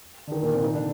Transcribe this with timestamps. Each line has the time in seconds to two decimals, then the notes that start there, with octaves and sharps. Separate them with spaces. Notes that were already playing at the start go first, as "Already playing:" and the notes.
0.27 D3
0.32 D#3
0.43 A#2 A#3
0.53 C3 C4
0.63 D#3 D#4
0.73 D3 D4